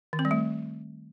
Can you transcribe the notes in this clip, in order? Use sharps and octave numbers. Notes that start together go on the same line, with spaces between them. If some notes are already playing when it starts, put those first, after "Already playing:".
D#3
C4
G3
A3